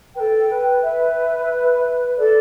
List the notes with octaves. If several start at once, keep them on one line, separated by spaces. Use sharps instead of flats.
A4 B4 G5
B4
B4 E5
A4 D5